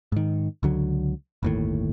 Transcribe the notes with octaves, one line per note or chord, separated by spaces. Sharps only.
G#2 D#3
C#2 D3 F#3
G1 D#2 A2